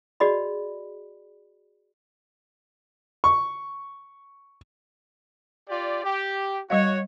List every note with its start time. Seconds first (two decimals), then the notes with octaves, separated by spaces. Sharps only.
0.20 F#4 G#4 D5 D#5 B5
3.24 C#6
5.68 F4 G4 D5
6.04 G4
6.70 G3 F#4 C#5 D#5 F5